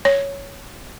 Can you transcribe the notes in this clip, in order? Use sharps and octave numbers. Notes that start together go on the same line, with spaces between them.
C#5